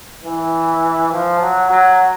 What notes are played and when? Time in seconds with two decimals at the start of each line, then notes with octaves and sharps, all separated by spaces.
0.25 E3
1.12 F3
1.41 F#3
1.70 F#3